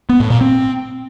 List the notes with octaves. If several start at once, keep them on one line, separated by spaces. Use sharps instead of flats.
B3
A2
A#2
C4